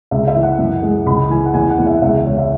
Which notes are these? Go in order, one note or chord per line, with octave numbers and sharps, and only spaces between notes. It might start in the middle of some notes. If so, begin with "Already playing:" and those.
C#2 E5
E5
E3
F#5
F#2
G#3
C#2 B5
E3 G#5
F#5
E2 G#5
F#5
E2
E5
C#2 E5
C#2 C#5
E5